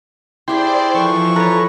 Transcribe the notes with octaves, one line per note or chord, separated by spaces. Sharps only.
E4 G4 G#4 C5 D5 G5 C6
E3 F3 A4 C#6
A4 B4 C#5 A#5